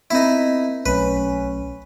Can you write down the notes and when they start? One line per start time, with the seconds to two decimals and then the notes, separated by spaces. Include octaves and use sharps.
0.11 B3 C4 D#4 E4 A#4
0.86 B1 A3 C#4 B4